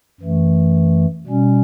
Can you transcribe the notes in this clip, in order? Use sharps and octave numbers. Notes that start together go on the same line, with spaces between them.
F#2 E3 A3
B2 G3 C#4